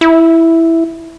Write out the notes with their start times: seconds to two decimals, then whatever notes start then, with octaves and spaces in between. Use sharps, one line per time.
0.01 E4